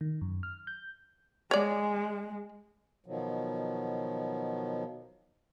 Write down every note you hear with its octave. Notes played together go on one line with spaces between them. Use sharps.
D#3
F#2
F6
G6
G#3 C#5 D5
B2 D#3 F3 F#3